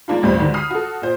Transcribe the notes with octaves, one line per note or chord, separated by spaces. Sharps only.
G#3 A#3 D4 D#4 F4
A1 D2 G2 C5 B5
G#2 D3 D#3 F#3
B5 D#6 F6 C7
F#4 A4
A#2 C5